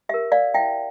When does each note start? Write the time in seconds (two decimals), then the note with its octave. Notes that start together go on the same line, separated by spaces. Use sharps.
0.09 G4 A#4 E5
0.32 D5 F5
0.54 E4 E5 G5